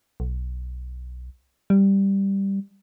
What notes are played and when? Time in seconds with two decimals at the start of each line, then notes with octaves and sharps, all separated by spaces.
0.20 B1
1.70 G3